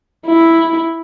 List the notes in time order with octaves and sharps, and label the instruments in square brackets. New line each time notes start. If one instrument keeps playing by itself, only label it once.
[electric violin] E4